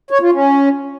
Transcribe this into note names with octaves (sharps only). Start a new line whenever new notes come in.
C#5
F4
C#4